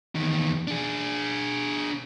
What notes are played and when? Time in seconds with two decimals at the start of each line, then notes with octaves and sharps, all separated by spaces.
0.15 E2 D#3
0.67 D4 G#4